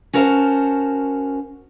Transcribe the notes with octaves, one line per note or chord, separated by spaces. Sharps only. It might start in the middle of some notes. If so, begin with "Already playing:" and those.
C#4 F#4 A#4 C5 E5 A5